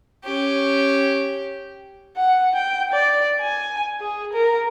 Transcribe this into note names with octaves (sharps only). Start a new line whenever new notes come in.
C#4 G4
F#5
G5
D5
G#5
G#4
A#4